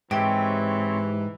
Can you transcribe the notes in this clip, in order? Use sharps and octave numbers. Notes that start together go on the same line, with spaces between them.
G#2 E3 C4 G4 C#5